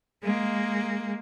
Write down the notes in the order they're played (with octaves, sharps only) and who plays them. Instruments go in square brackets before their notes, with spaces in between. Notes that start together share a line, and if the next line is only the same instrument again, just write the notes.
[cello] G#3 A#3